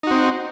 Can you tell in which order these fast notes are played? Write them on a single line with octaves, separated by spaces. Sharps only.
D#4 F#4 C4